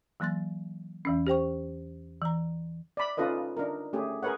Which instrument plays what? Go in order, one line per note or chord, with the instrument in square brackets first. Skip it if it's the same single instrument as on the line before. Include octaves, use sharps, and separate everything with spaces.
[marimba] E3 F#3 A#3 C6 A6
E2 E3 C#4
G4 C5 G5 C#6
E3 A#5
[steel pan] D5 B5
C#4 D#4 F4 A4 B4 D#5
D4 D#4 A#4
A3 C#4 G4 G#4
G#4 A#4 B4 C#5 F#5